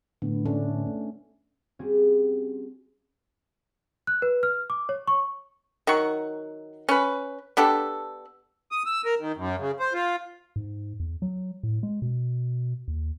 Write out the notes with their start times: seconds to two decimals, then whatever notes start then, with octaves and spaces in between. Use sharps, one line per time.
0.22 A2 D3 B3
0.46 A3 C#4 D4
1.79 G3 C4 C#4 F#4 G#4
4.07 F#6
4.22 B4
4.43 F6
4.70 D6
4.89 C#5
5.07 C#6
5.87 D#3 F#3 F#5 C#6
6.89 C#4 B4
7.57 B3 D4 G4 A4
8.72 D#6
8.86 E6
9.05 A#4
9.20 D#3
9.36 F#2
9.59 C#3
9.80 C5
9.93 F4
10.56 G#2
11.00 E2
11.22 F#3
11.63 A2
11.83 G#3
12.02 B2
12.88 D#2